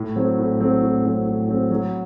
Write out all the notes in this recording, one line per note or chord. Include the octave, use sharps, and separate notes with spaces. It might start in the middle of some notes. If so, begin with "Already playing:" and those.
Already playing: A2
F#3 C4
A2
F#3 C4
A2
F#3 C4
A2
F#3 C4
F#3